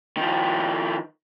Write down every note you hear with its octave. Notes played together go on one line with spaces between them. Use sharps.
D#3 F3